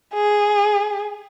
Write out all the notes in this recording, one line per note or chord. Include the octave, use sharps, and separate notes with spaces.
G#4